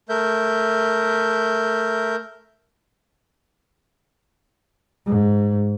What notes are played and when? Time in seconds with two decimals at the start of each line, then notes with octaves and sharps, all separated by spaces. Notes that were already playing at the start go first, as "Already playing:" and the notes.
0.09 A3 A#4 E5 G6
5.06 G#2